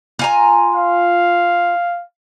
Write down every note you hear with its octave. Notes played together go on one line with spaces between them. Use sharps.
F4 G#5 A#5
F5